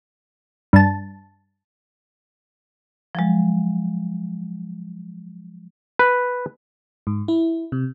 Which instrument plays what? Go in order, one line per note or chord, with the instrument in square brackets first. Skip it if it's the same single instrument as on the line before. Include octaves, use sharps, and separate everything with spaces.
[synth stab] G2 A5
[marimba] F3 F#3 G#3
[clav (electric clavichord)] B4
[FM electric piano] G#2
E4
C3